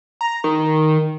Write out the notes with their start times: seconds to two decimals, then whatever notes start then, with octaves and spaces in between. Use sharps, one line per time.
0.21 A#5
0.44 D#3